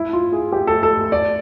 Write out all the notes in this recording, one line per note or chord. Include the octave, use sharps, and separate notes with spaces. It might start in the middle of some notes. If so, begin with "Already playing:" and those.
Already playing: E4
F4
G#4
G4
A4
A4
D5